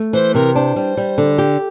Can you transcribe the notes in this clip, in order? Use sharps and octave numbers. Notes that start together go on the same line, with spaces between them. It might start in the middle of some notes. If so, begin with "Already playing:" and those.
Already playing: A3
E3 C5
C3 A#4
D4 C5
G3
G3
D3
G4